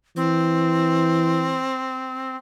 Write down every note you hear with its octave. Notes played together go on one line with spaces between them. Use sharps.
E3 C4